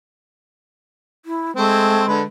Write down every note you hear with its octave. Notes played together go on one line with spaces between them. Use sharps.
E4
G#3 A3 C4
D3 B4